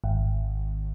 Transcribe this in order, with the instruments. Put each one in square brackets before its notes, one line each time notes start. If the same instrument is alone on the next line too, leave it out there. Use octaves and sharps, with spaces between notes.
[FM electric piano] G#1